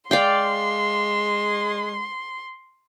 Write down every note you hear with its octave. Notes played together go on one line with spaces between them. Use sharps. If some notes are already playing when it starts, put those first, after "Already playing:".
G#3 D5 F5 G5 C6